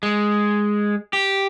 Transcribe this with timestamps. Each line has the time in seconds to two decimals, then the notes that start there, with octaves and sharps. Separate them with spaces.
0.03 G#3
1.13 G4